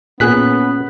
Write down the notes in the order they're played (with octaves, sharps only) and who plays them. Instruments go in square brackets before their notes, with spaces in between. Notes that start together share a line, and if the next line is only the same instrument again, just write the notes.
[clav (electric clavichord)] A#2 G#4 G#5 [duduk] B3 [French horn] C#4 [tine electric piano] F#6 B6